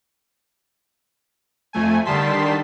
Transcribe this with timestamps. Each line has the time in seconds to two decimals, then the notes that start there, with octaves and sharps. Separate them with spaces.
1.73 F2 A3 G#5
2.05 D3 D#3 G3 A5 C6 B6